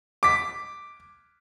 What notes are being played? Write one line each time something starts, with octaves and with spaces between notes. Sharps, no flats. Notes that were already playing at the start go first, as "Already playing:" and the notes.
D6 B6